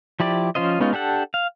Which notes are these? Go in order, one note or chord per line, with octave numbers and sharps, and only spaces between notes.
F3 E4 G4 D5
F3 C#4 F4 C5 D#5
G#3 B3 C#4 D#4 F4
D4 G4 A4 F#5
F5